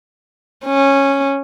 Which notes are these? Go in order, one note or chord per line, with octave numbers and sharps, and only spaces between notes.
C#4